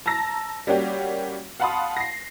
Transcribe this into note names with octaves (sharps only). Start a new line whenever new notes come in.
A5 A#5 E6 A#6
G3 A#3 C#4 F#4 G4
F5 F#5 A5 B5 C6 D#6
A#6 C7